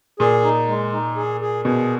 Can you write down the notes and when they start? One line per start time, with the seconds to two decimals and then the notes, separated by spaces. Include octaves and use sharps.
0.20 A#2 G#4
0.44 D#4
0.68 G#3
0.93 D#4
1.16 G#4
1.41 G#4
1.65 B2 G#4